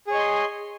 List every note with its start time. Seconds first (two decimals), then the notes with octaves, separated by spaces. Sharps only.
0.07 G#4
0.11 C#5
0.14 D#5
0.18 C6